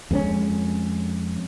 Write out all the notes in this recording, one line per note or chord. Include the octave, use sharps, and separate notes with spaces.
F2 G#3 B3 C#4